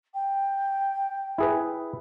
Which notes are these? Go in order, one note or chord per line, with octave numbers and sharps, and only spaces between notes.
G5
E4 G#4 B4